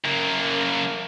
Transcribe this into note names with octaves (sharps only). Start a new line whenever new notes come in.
F#2 A#3